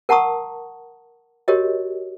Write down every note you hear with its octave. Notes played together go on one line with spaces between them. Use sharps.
A#4 F#5 A5 A#5 C#6 D#6
F#4 G4 A#4 C#5 D#5